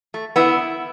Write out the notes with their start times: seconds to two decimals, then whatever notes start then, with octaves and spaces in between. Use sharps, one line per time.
0.14 A3
0.36 D3 B3 E4